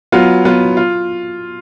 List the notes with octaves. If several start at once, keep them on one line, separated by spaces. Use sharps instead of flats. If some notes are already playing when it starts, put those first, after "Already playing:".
F#3 B3 F4
F#3 B3 F4
F4